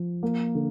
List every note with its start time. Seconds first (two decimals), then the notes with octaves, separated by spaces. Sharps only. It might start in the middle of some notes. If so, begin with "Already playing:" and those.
Already playing: F3
0.23 A#3
0.55 D3